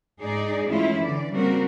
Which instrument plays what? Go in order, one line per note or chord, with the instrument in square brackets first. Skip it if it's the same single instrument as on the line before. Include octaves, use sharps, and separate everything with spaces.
[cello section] G#2 D#4 G#4 D5
E3 G#3 A3 C#4 E4 F4
D3 E3 D5
C#3 G3 A#3 C4 F#4 A#4